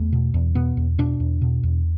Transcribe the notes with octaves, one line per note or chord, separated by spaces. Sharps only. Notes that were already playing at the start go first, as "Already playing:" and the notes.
Already playing: E2 A3
B2
E2
B2 B3
E2
B2 D4
E2
B2
E2